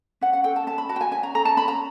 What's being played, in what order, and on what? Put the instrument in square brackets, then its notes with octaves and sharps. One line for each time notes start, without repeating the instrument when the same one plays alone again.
[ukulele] C#4 F#5
F#5
A4 G5
A5
C#4 A5
B5
F#4 A5
G5
G#5
C#4 G#5
A#5
A4 A#5
A5
C#4 B5
A#5